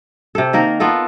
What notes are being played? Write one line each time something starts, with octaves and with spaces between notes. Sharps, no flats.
C3 A4
D#3 A#3 A#4
B3 F4 A4 A#4